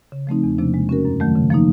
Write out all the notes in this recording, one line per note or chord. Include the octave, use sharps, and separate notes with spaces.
C#3
F3 A3 C4 D#4
E2
C3 F3 A#3 D4
G#3
C#4 F#4 A#4
F#2
D#3 F#3 A3
C#3
F3 A#3 D#4